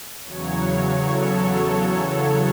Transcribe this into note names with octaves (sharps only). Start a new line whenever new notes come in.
E2 C#3 F#3 C#5
A4
A4